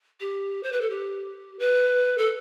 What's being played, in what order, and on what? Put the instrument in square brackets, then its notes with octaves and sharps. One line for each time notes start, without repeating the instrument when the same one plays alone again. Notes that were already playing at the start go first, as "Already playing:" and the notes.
[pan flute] G4
C5
B4
A4
G4
B4
A4